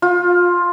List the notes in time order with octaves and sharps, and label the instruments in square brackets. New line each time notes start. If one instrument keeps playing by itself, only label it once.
[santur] F4